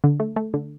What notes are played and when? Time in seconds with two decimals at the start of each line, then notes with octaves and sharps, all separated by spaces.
0.04 D3
0.20 A3
0.36 A3
0.54 D3